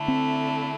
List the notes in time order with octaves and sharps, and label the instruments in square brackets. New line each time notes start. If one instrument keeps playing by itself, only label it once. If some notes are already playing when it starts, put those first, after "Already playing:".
Already playing: [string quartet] D3 A3 E4
[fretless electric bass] C4